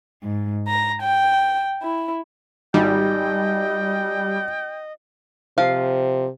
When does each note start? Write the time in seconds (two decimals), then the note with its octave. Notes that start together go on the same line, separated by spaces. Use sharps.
0.24 G#2
0.68 A#5
1.02 G5
1.82 E4
2.74 G#1 D#3 G3 G4 D#5 G5
5.58 C3 F3 F5